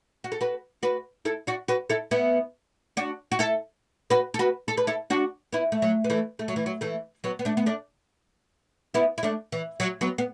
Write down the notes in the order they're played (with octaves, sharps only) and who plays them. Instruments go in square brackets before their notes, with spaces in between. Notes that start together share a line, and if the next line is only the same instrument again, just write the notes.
[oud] F#4
A4
F#4 B4
F#4 B4
E4 A4
D4 F#4
F#4 B4
E4 A4
B3 E4
D4 F#4
F#4
E4 A4
F#4 B4
A4
F#4 B4
A4
B4
E4 A4
D4 F#4
B3 E4
A3
F#3
B3
E3 A3
A3
F#3
E3
F#3
E3 A3
F#3 B3
B3
A3 D4
B3
A3 D4
B3 E4
E4
A3 D4
E3
F#3
F#3 B3
B3